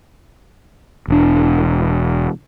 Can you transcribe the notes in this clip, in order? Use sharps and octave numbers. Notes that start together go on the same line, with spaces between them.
E1 D4